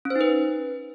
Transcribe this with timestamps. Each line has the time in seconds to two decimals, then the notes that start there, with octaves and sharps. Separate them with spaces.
0.05 C#4
0.10 C5
0.16 D#4
0.21 B4